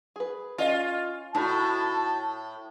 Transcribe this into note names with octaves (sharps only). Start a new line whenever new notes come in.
G#4 B4
C#4 F4 D#5 F5
A2 D#4 F#4 A5 B5